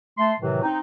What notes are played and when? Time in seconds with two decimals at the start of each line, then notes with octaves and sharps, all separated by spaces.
0.18 A3 A5 C6
0.39 A2 C3 D#3 E3 F#3
0.63 C4 D#4